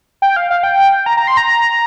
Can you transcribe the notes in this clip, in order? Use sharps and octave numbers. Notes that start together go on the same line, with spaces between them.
G5
F5
F5
G5
A#5
A#5
C6
A#5